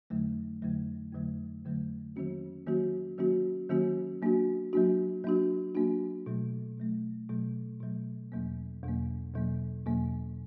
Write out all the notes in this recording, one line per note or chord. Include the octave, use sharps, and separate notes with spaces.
F2 D3 F#3 A3
F2 D3 F#3 A3
F2 D3 F#3 A3
F2 D3 F#3 A3
D#3 F#3 A#3 C#4 F#4
D#3 F#3 A#3 C#4 F#4
D#3 F#3 A#3 C#4 F#4
D#3 F#3 A#3 C#4 F#4
F#3 A#3 D4 F#4
F#3 A#3 D4 F#4
F#3 A#3 D4 F#4
F#3 A#3 D4 F#4
B2 F#3 A3
B2 F#3 A3
B2 F#3 A3
B2 F#3 A3
E2 B2 F#3 A#3
E2 B2 F#3 A#3
E2 B2 F#3 A#3
E2 B2 F#3 A#3